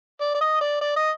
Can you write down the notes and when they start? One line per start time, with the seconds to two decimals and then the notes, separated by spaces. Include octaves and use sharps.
0.21 D5
0.34 D5
0.41 D#5
0.61 D5
0.81 D5
0.96 D#5